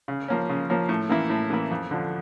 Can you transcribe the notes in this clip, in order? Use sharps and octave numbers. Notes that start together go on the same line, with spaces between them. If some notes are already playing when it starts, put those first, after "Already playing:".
C#3
F3 A#3 C#4
C#3
F3 A#3 C#4
A2
E3 A#3 E4
A2
E3 A#3 E4
F2
D3 F3